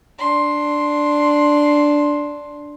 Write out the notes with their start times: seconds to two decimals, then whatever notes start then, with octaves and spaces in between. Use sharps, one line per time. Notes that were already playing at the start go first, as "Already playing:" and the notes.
0.18 D4 C6